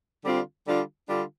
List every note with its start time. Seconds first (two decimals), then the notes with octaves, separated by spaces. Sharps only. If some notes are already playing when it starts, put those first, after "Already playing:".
0.24 D3 G3 C4 F4
0.66 D3 G3 D4 F4
1.08 D3 G3 D4 F4